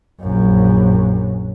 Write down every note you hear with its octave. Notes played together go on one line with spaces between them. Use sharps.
A#1 F#2